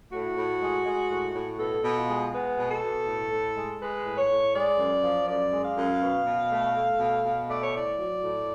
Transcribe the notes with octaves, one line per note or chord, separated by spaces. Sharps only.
A2 F#4
A2
G#3
G#3
A2
A2
B2 A4
B2
F4
G#3
G#3 B3
B2
A4
B2
A2
A2
G#3
G#3 B4
A2
C#5
A2
G#3 D5
F#2
F3
F#2 D5
G#3
F5
F#2
B2
B2
A3
A3
B2
B2
A3 D5
C#5
A2 D5
F#3
A2